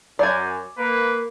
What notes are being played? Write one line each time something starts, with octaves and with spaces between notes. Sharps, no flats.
F#2 D5 G#5
A#3 B4